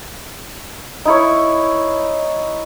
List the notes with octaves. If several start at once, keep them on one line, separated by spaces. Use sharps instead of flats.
D#4 E4 C#5